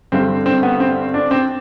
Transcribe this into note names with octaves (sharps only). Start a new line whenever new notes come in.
G2 D3 G3 C4
C4
B3
C4
D4
C4